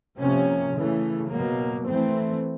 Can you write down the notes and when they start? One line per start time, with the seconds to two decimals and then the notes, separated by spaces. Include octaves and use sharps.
0.18 C3 F3 A#3 C#4
0.75 C#3 E3 A3
1.32 B2 F#3 A#3
1.89 E3 A3 C4